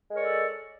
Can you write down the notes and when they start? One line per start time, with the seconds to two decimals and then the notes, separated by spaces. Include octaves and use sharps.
0.10 G#3
0.12 A#4
0.15 C#5
0.18 D5
0.21 A4